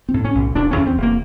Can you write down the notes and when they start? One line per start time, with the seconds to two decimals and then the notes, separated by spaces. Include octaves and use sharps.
0.09 C4
0.14 A2
0.25 C#4
0.35 B1
0.55 E1 D4
0.71 C#4
0.76 E2
0.87 C4
0.97 E1
1.02 A#3